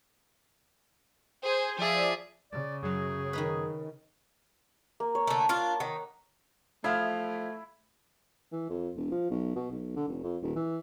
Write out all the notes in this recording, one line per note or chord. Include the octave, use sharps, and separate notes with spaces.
G#4 C5 G#5
F3 G#4 D5 E5
C#3 D5
F#2 F#3 G#4
D#3 D#4 B4
A#3
C#5
D3 A3
D4 F4
D#3 F#5
F3 A3 E4 F5
E3
F2
E1
F3
B1
B2
B1
D3
F1
F2
D#1
E3